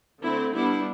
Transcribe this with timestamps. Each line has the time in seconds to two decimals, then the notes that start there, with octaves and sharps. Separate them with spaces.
0.22 D3 A3 C4 E4
0.53 G3 B3 D4 E4